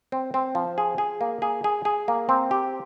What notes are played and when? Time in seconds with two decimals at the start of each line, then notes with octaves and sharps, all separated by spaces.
0.12 C4
0.34 C4
0.55 F3
0.78 G#4
0.98 G#4
1.21 A#3
1.42 G#4
1.64 G#4
1.85 G#4
2.08 A#3
2.29 C4
2.51 G4